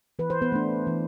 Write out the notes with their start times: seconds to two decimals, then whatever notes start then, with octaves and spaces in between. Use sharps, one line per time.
0.19 E3 B4
0.30 C5
0.42 B3 B4
0.52 A3 D4
0.87 E3